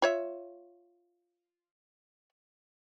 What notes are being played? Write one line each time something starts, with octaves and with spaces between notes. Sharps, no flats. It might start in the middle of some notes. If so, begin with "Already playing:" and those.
F4 C#5 E5